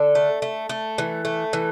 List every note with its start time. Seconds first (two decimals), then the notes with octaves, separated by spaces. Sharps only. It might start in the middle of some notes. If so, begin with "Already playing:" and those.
Already playing: D3 A4
0.15 A3
0.42 A3
0.69 A3
0.98 E3
1.25 A3
1.53 E3